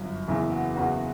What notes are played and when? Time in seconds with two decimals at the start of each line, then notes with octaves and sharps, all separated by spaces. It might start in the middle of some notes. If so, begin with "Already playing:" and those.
Already playing: G1 F#2
0.28 F#1 E2 C#3 E3 E4
0.52 F#4
0.75 F#1 E2 C#3 E3 F#4